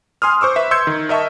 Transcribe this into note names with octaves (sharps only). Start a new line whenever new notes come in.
G#5 C6 D#6 F6
C5 C#6 D6 E6
B4 E5
C6 E6 G6 G#6 C#7
D#3
A#4 D#5 E5 A5 C#6